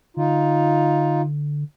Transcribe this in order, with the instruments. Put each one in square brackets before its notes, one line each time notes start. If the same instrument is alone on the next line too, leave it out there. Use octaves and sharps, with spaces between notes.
[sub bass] D3 [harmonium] D#4 F4